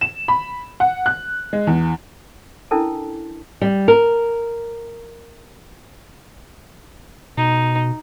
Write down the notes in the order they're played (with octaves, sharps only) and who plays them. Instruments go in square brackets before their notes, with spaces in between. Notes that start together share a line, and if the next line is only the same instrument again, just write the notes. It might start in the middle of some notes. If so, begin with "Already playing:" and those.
[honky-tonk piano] E7
B5
F#5
F#6
G#3
E2
[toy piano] C#4 D4 E4 A4 A#4 A5
[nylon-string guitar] G3
A#4
[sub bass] B2 [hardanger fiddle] D#4